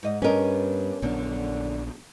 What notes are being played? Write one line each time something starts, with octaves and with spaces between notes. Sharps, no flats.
G#2 D#5
G2 B3 C#4 A#4 D#5
A#1 F#2 D3 B3 D4